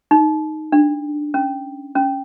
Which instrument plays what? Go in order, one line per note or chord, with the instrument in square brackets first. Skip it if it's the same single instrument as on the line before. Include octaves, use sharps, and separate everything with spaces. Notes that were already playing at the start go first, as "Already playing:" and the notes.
[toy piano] D#4
D4
C#4
C#4